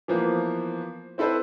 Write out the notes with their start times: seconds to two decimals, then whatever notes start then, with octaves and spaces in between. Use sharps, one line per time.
0.08 E3 F3 A#3 B3
1.18 C4 E4 A4 B4 C5